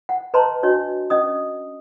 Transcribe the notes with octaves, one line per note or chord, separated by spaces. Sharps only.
F#5
B4 C#5 D#5 A5 A#5 C6
D4 F#4 C#5 D#5
C#4 D#5 D#6